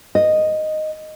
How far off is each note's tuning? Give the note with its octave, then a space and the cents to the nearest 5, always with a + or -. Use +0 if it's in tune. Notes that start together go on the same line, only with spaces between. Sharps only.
D#5 -5